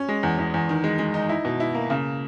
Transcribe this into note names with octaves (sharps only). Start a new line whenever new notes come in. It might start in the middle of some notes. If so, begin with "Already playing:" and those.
Already playing: C#4
G#3
E2
E2
E2
D#3
G#3
G#3
D#4
E4
B2
E4
A#3
C#3